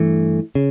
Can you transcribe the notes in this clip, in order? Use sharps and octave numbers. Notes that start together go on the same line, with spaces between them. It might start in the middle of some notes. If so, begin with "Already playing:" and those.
Already playing: G2 E3 A3
C#3